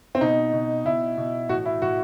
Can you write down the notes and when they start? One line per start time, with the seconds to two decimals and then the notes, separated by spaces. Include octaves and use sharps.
0.15 C4
0.21 B2 D#4
0.53 B2
0.85 B2 E4
1.17 B2
1.49 A2 F#4
1.53 E3
1.65 E4
1.81 A2 E3 F#4